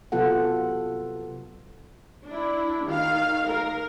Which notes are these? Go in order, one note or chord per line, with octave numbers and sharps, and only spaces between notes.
C3 F#3 B3 F4 A4 F#5
D4 E4
D#3 F5
A#4